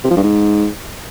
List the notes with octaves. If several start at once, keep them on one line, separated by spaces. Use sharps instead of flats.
C3
F3
G2
G#2